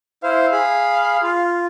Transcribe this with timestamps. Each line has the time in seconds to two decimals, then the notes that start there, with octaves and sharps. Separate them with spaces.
0.23 E4 C5 F5
0.52 G#4 B5
1.23 F4